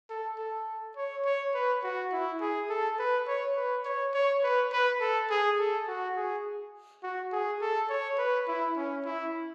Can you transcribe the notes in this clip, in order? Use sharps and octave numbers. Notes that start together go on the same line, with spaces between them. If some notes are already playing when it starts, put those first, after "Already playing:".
A4
A4
C#5
C#5
B4
F#4
E4
G#4
A4
B4
C#5
B4
C#5
C#5
B4
B4
A4
G#4
A4
F#4
G#4
F#4
G#4
A4
C#5
B4
E4
C#4
E4